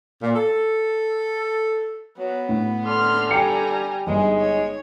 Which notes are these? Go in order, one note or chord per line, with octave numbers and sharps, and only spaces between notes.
A#2
A4
F#3 B3
A2
D3 C6 F6
G3 G5 G#5 A#5 C#7
G1 G#3 D#4 G#4
C#5